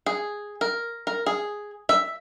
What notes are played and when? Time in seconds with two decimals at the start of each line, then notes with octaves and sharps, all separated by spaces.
0.06 G#4
0.61 A#4
1.07 A#4
1.26 G#4
1.89 E5